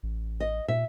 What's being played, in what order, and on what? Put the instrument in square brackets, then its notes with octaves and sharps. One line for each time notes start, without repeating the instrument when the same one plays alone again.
[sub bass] A1
[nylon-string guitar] D#5
[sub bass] A#2 [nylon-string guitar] E5